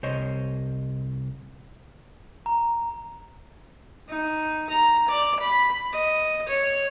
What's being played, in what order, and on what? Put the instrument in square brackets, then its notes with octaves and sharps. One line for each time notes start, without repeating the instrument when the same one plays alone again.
[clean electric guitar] C2 C5 C#5 D#5
[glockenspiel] A#5
[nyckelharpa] D#4
A#5
D5
B5
D#5
C#5